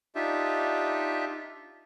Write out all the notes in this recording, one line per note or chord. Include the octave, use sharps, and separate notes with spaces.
D4 D#4 F4 G4 E5